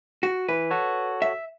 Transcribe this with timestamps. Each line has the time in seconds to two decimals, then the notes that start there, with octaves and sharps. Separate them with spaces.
0.23 F#4
0.48 E3 B4
0.70 F#4 A4 C#5
1.22 E5